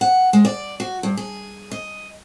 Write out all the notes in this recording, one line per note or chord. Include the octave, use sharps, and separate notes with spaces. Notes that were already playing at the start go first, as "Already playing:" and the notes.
F#5
G#3
D5
F#4
G2
G#4
D#5